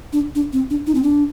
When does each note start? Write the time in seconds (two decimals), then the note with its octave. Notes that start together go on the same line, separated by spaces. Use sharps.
0.13 D4
0.35 D4
0.53 C4
0.70 D4
0.87 D#4
0.95 C4
1.03 D4